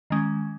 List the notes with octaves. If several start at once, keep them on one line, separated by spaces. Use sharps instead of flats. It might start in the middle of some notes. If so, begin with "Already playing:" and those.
D#3 G#3 C#4